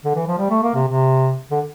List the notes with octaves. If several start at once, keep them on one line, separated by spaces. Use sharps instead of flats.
D3
E3
F3
G3
A3
A#3
C3
C3
D3